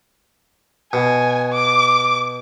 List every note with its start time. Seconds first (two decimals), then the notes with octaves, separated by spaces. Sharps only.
0.93 B2 G#5
1.53 D6